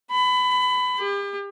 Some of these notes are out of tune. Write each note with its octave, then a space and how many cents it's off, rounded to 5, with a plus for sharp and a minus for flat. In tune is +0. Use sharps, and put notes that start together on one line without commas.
B5 +25
G4 +40